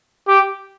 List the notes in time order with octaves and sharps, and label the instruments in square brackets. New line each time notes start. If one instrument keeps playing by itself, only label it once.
[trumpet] G4